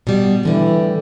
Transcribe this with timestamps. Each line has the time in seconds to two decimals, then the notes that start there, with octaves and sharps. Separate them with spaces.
0.07 B2 G3
0.43 A2 D3 E3 G3